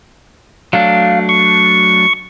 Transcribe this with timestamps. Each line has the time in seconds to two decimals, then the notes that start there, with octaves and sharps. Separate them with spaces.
0.73 F#3 A3 D4 F5
1.29 C#6